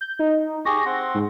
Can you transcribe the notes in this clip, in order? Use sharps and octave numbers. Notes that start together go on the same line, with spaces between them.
G6
D#4
G4 G#4 C#6 A#6
C4 F#5 C6
G#2